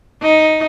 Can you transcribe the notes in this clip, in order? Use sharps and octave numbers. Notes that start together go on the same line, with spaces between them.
D#4